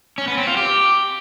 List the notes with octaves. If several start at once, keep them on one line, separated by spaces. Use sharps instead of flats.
C#4
B3
C4
F4
G4